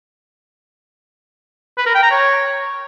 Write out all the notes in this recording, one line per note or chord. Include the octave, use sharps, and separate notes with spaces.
B4
A#4
G5
A#5
C#5